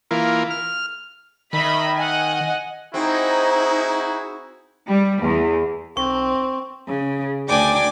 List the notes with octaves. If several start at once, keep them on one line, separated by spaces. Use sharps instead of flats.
E3 A#3 F4
F6
D#3 D#5 E5 B5
D#5 F#5 G#5
C4 D#4 E4 F#4 G#4
G3
E2
B1 C4 C#6
C#3
D2 D4 D5 G5 G#5 D6